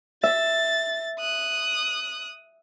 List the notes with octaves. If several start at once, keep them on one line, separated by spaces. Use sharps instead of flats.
E5 A6
D#6 F#6